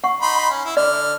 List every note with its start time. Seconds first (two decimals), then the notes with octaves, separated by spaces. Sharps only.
0.04 F#5 C#6
0.22 D#4 B5 C6
0.50 C#4
0.65 E4
0.77 D3 D5 F6